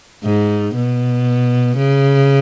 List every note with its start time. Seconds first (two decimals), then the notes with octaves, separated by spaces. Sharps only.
0.24 G#2
0.75 B2
1.78 C#3